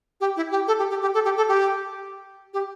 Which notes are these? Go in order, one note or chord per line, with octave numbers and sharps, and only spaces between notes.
G4
E4
G4
A4
G4
G4
G4
A4
G4
A4
G4
G4